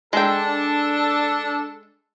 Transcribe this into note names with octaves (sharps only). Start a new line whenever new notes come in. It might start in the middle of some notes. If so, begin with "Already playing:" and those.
G#3 D4 A4 G5